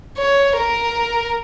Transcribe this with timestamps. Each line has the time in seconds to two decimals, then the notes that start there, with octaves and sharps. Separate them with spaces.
0.18 C#5
0.58 A#4